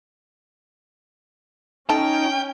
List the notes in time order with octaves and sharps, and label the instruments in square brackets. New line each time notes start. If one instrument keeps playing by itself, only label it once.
[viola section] C#4 [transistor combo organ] D#4 [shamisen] A4 [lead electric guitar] G5